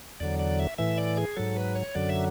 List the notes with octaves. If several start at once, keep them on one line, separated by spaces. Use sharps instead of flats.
E2 D3 F#3 D5
D5
E5
A2 E3 E5
D5
G#4
G#2 F#3 A4
B4
C#5
F#2 D3 F#3 D5
E5